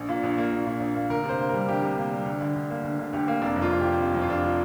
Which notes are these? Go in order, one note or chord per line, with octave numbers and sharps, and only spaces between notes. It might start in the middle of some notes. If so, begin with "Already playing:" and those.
Already playing: A#1
A#2
A#1
A#3
A#1
A#2
A#1
A#3
D2 A#4
C3 C5
A#3
G3 A#4
D2 G4
C3
A#3
G3
D2
D3
D2
A#3
D2
D3
D2 G4
A#3
F1 D4
F2
F4
F1
F3 G4
F1
F2
F4
F1 D4
F3